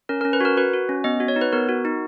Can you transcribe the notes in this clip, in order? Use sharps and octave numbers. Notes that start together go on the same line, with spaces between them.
C#4 A#4
A#4
C#4
B4
F#4 A#4
F#4 B4
F#4
C#4
B3 D#5
F#4
C#5
D#4
B4
B3 A#4
F#4
D#4